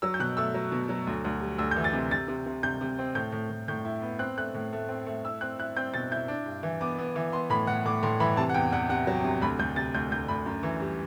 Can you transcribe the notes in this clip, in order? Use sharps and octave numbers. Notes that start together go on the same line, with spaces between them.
F#3 E6
G6
B2 F#6
A3 E6
F#3
B2
F#3
D2
D2
G3
D2 E6
G6
E3
A6
C3
C3 A6
C3
C3
C3 G6
C3
C4
A2 G6
A2
A2
A2 G6
E4
B3
C4 F#6
A3 F#6
A2
A3
C4
A3
E4 E6
C4 F#6
E4 F#6
C4 G6
B2 A6
E4 G6
D4
G2
E3
B3 D6
B3
E3
B3 C6
A2 B5
A2 F#5
A2 D6
A2 C6
E3 B5
C3 A5
F#5
E2 G5
E2 F#5
C3 F#5
F#3
C3
D2 B5
D2 G6
C3 A6
D2 G6
D2 G6
D2 B5
F#2
E3
G3